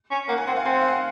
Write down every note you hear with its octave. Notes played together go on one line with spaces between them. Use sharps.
C#4
A#3 F#5
G#5
C4 F#5
F5
C4 G#5
F#5
F5
F#5